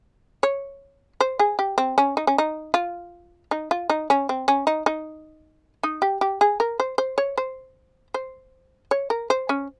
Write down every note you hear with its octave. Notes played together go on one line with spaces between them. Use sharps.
C#5
C5
G#4
G4
C4
C#4
D#4
C#4
D#4
F4
D#4
F4
D#4
C#4
C4
C#4
D#4
D#4
D#4
G4
G4
G#4
A#4
C5
C5
C#5
C5
C5
C#5
A#4
C5
C#4